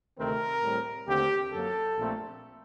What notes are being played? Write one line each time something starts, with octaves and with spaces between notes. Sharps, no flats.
D2 C3 D#3 A3 C4 A#4
A2 G3 C4
D#2 D3 A3 C4 G4
F#2 F#3 A#3 A4
A#1 A#2 A3 C4